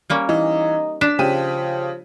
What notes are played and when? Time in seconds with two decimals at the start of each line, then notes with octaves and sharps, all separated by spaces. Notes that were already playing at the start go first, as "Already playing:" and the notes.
0.10 G3 A#3 C#4
0.29 E3 D#4
1.01 D4 B6 E7
1.19 C#3 F3 G4 D#7